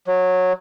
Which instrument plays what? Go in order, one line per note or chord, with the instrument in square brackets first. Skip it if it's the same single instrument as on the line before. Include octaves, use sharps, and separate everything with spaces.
[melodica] F#3